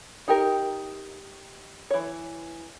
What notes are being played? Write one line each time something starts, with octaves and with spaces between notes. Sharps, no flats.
D#4 G4 A#4
E3 C#5